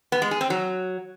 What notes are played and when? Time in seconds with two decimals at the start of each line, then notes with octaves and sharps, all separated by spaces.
0.12 B3
0.22 G#3
0.31 G#4
0.41 C4
0.50 F#3